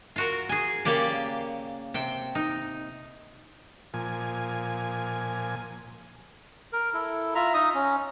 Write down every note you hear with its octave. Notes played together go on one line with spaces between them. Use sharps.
F4 F#4 A#4
G#4 G#5
C#3 A#3 G4 D5
C3 G5
D#4
A#2 F3 G#5
A#4
E4 A4
F4 E5 A#5
D#4 D#5 D#6
C#4